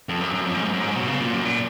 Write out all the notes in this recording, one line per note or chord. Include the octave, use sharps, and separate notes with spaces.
F2
F#2
F#2
F2
G#2
G#2
F#2
G#2
B2
C#3
A#2
F#2
A#2